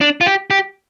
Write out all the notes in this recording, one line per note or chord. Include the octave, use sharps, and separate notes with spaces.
D4
F4
G4
G4